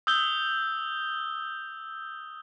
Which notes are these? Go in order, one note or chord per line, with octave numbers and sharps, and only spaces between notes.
D#6 E6 G6 G7